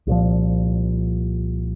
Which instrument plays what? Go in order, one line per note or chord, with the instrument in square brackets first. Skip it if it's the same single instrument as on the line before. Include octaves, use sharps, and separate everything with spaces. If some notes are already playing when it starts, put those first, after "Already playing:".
[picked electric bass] C2 A#2 F3